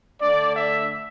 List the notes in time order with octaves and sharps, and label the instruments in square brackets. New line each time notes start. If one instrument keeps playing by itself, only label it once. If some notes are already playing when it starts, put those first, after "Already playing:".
[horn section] D3 A3 D4 D5
E5